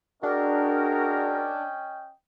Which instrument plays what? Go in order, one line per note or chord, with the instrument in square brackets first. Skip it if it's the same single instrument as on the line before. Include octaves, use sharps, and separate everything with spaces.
[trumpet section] C#4 D#5 G5 [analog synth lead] D4 [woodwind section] F#4 G#4 A#4